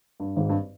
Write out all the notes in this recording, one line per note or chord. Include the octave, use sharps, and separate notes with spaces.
G2
G#1 G#2
G2